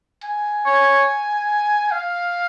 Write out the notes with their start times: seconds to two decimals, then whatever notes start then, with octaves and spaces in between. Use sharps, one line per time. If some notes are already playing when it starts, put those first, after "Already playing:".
0.24 G#5
0.66 C#5
1.91 F5